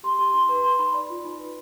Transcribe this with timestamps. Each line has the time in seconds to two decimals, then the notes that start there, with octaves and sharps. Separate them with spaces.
0.03 G4 C6
0.19 G4 C6
0.34 D#4 C6
0.49 B4
0.64 B4 C6
0.79 D#4 B5
0.94 D5
1.10 F4
1.24 D#4
1.40 B4